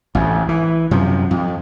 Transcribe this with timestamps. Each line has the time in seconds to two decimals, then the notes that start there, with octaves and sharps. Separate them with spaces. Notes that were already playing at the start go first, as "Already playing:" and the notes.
0.15 A1 F2
0.49 E3
0.91 F#2 C3 F3
1.31 F2